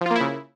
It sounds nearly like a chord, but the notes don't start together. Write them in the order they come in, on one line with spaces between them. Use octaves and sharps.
F3 F4 A#3 E4 C#3